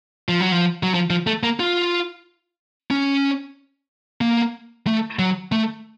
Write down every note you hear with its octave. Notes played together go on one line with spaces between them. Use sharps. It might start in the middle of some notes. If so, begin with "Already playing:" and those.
F3
F#3
F3
F#3
F3
F3
A3
A#3
F4
C#4
A#3
A3
F#3
A3